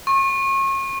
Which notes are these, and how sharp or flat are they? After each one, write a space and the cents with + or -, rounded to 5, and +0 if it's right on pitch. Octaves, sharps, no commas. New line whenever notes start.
C#6 -35